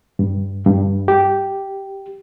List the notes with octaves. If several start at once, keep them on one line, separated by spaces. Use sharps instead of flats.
G2
G2
G4